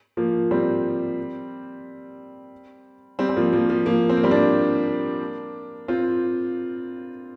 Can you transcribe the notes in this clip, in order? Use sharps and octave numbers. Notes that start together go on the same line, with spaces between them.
F3 A#3
G3 C4
G3 C4
C4
F3 A#3
F3 A#3
F3
F3 A#3
C4
A#3
G3 C4
A#3 D4
C4 F4